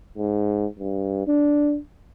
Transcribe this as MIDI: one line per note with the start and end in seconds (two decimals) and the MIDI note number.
0.18 0.66 44
0.79 1.24 43
1.27 1.78 62